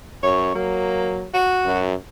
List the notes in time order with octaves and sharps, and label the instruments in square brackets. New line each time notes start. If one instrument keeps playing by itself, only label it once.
[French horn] F#2 [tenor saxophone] C#5
[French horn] F#3 [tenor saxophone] A#3
[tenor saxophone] F#4
[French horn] F#2